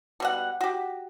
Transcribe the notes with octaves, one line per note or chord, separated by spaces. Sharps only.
B2 G3 F#5
F#4 G4